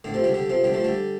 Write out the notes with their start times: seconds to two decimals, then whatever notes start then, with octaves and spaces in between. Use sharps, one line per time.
0.04 A2 D3
0.14 C3 F3
0.24 D3 G3
0.34 D3 G3
0.49 C3 F3
0.64 D3 G3
0.74 F3 A3
0.84 D3 G3